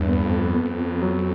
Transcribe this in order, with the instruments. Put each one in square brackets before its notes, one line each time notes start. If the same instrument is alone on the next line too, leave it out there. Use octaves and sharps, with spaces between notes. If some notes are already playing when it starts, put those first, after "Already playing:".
Already playing: [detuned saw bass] E2 [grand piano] G2
[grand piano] B3
[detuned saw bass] F2
[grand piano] B3
F#3